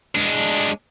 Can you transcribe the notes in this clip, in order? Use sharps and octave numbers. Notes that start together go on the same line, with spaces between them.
G#3 D4